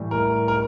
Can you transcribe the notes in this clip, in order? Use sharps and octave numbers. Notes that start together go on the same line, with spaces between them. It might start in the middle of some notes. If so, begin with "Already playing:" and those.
Already playing: A2 E3 G3
A#4
A#4